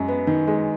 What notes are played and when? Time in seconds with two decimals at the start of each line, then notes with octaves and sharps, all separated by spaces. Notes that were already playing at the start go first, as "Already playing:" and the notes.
Already playing: F#2 G#3
0.08 B3
0.27 D#3
0.47 G#3